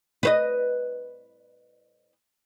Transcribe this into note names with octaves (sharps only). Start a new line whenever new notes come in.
B4 C5 D#5